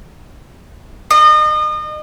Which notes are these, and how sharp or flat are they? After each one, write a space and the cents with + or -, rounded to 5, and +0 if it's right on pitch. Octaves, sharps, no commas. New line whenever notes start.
D#5 -35